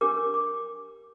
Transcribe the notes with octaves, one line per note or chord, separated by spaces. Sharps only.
D4 G4 A#4 D6
D6